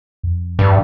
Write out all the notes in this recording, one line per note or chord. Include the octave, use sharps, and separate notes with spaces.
F2
G2